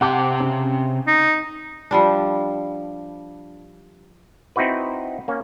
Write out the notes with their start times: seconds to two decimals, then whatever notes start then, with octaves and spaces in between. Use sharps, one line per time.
0.01 C3 G4 F#5 G5 A5 D6
0.40 C#3
1.07 D#4
1.91 F3 G3 D4
4.56 C4 D#4 E4 F#4 B4
5.28 A#3 C#4